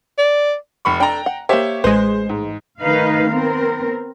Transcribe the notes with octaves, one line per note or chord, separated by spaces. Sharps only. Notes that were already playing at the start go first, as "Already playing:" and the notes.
D5
F1 B5 C#6
D4 A4 G5 A#5
F#5
A#3 G4 C5 C#5 E5
A1 G#3 B4 C5
G#2
D#3 A3 D#4 B4 F5
B3 C4 A#4